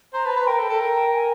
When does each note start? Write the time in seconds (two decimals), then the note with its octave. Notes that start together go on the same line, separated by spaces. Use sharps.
0.14 C5 A#5
0.25 B4 A5
0.30 A#5
0.36 B4
0.47 A#4 G5
0.59 A4
0.70 A4
0.80 A#4
1.14 G#5